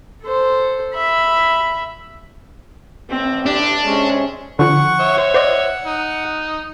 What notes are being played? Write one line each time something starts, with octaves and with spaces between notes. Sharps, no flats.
A4 C5
E5 B5
A1 C4
D4 G4
C3 G#3 C#4
D3 F3 F#5 C#6
C#5 E5
C5
C5 D5 D#5 F#5
D#4